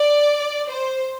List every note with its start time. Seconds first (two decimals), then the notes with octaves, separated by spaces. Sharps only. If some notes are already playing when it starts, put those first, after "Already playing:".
Already playing: D5
0.69 C5